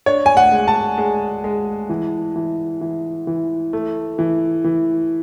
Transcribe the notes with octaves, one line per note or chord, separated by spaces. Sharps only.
D4 C#5
G#5
F#5
G#3
A5
G#3
G#3
E3
E3
E3
E3
A3
E3
E3